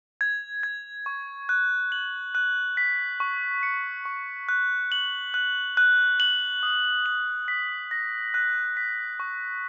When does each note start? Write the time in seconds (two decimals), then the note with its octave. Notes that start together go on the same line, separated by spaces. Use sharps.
0.21 G#6
0.63 G#6
1.06 C#6
1.49 F#6
1.92 F#7
2.35 F#6
2.77 B6
3.20 C#6
3.63 C#7
4.05 C#6
4.49 F#6
4.92 F#7
5.34 F#6
5.77 F#6
6.20 F#7
6.63 D#6
7.06 F#7
7.48 B6
7.91 A#6
8.34 F#6
8.77 B6
9.20 C#6